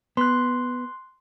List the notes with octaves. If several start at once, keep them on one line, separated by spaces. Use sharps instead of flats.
B3 C6 F#6